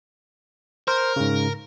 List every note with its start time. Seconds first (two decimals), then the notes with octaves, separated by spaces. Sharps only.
0.88 A#4 C5
1.16 G#2 C#3